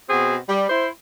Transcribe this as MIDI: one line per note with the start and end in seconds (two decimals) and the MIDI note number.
0.09 0.36 47
0.09 0.36 60
0.09 0.36 66
0.09 0.36 68
0.49 0.69 55
0.69 0.88 64
0.69 0.88 72